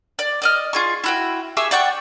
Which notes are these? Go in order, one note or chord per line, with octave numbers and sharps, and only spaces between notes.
D5
D5 D#5 F6
F4 G#4 C#6
E4 F#4 G5
G4 G#4 E5 C#6
D5 F#5 G5 C#6